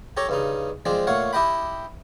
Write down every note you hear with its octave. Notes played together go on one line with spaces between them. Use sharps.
G4 A4 C#5 A#5
G2 C#3 D#4
F3 G#3 C4 D4
A#2 A3 C#5 F5 F#5
E4 G4 D#5 G5 B5